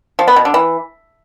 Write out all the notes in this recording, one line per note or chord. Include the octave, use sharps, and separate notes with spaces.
F3
B3
B2
D3
E3